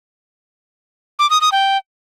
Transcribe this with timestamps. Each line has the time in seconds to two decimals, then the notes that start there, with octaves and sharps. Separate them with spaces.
1.19 D6
1.30 D#6
1.41 D#6
1.52 G5